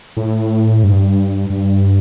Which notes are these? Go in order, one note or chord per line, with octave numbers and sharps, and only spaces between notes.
A2
G2
G2